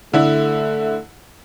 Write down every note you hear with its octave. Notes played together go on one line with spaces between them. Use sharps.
D3 A3 E4